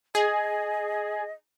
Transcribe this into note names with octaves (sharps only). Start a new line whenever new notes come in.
G#4 D#5